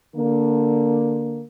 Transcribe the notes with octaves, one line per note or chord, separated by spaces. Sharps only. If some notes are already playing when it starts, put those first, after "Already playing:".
D3 A#3